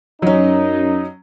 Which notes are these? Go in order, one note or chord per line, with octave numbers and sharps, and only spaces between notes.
F#2 F#3 C#4 D#4